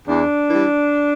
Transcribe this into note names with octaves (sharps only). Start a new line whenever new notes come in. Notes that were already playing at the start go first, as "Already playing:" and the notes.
E2 D4
E3 G3